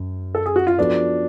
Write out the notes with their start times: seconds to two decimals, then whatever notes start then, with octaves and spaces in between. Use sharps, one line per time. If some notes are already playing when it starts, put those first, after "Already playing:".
Already playing: F#2
0.35 A4
0.46 G#4
0.56 F#4
0.67 F4
0.78 F3 B3 D4 F#4 A4